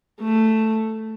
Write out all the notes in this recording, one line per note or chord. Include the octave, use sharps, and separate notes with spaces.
A3